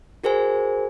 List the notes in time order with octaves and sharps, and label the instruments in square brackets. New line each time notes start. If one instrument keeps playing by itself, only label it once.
[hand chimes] F#4 G#4 A#4 C5 G#5